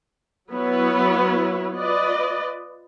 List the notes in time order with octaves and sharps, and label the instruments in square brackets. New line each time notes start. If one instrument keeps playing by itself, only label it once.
[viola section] F#3 B3 E4 B4 C#5
F4 B4 D5 D#5